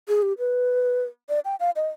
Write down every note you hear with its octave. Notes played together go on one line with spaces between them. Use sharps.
G#4
G4
B4
D5
G5
F5
D#5